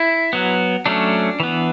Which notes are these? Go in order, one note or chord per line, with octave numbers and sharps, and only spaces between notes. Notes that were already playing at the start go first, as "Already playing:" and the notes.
Already playing: E4
F#3 B3
F#3 A3 C#4 D4
E3 B3